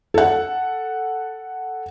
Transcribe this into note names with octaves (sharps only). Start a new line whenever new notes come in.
A4 F#5